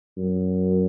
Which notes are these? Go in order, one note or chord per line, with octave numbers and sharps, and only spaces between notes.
F#2